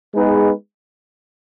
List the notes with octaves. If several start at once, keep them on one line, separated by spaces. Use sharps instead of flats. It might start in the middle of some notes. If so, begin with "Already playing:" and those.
G#3 B3 D#4 G#4 B4